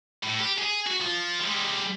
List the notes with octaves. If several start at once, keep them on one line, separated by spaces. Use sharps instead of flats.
A2
G4
G#4
F#4
F3 F4
G3 G#3